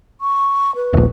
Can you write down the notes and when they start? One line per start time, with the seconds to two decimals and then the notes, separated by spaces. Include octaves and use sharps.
0.21 C#6
0.75 B4
0.93 D#1 A#1